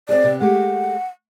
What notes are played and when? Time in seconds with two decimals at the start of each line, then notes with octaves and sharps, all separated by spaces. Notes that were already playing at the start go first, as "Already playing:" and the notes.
0.09 C4 F#4 G#4 D5
0.24 C3 B3
0.41 G#3 A3 G4 F#5